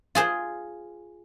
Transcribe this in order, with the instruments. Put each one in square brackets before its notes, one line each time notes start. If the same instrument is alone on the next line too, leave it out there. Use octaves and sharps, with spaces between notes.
[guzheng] F4 G#4 C5